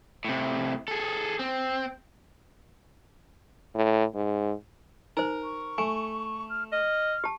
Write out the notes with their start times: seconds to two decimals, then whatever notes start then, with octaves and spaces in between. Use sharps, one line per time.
0.24 A2 C3
0.88 G#4 A4
1.39 C4
3.75 A2
4.15 G#2
5.17 D#4 A#4 C5
5.44 C#6
5.78 A3 G#5
6.50 F6
6.72 D#5 F6
7.24 G4 A5